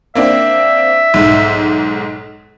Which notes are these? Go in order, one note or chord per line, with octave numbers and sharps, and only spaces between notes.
A#3 C4 D4 E5
B1 G#2